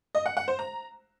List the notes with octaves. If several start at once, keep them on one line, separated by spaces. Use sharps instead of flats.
D#5
F#5
F#5
C5
A#5